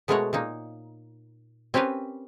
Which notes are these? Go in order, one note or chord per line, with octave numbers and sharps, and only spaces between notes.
B2 G#3 A3 A#4 C#5 F#5
A#2 A#3 D#4
C4 C#4 G4 A#4 B4